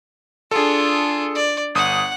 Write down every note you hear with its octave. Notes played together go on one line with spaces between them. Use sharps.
D4 F4 G#4 A4
D5
G1 F#5 D#6